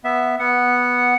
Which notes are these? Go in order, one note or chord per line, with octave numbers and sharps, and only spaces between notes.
B3 E5
B3 F#5